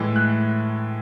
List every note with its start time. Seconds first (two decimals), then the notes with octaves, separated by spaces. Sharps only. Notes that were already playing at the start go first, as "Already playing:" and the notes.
Already playing: A2 E3 G#3
0.16 F#6